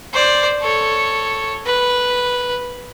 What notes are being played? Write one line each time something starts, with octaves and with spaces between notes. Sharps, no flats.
C5 D5
A4 C#5
B4